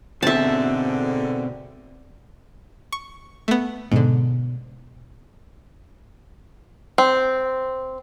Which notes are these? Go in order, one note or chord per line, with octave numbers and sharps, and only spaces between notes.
G#2 B2 D3 C4 E5 A5
C#6
A3 B3
G#2 B2 D3 B3
C4